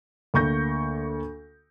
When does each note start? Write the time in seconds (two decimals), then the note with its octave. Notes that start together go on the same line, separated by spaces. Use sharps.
0.34 D2 A#3 C#6 G6 A#6